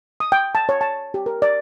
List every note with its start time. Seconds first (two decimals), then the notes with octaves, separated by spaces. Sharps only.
0.20 D#6
0.32 G5
0.55 A5
0.69 C#5
0.81 A5
1.14 G4
1.26 A#4
1.42 D5